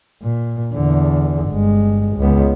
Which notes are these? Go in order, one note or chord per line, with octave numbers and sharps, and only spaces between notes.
A#2
E2 D3
G1 G#3
C#2 B3